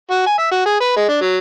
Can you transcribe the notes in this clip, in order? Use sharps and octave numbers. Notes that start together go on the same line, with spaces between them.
F#4
G#5
E5
F#4
G#4
B4
G#3
D4
F#3